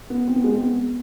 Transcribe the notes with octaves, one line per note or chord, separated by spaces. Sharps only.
B3
C4
B3
G#3
C4
B3